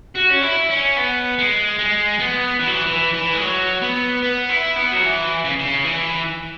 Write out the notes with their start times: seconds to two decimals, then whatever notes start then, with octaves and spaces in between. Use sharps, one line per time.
0.16 F#4
0.30 C#4
0.43 E4
0.70 C#4
0.97 B3
1.38 G#3
1.79 G#3
2.19 B3
2.59 E3
2.67 F#3
2.75 E3
2.86 E3
3.14 E3
3.33 G#3
3.41 F#3
3.82 B3
4.22 B3
4.49 E4
4.76 B3
4.92 F#3
5.03 E3
5.44 C#3
5.59 C#3
5.84 E3